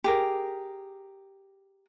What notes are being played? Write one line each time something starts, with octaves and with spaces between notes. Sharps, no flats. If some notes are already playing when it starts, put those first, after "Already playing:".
G4 G#4 A#4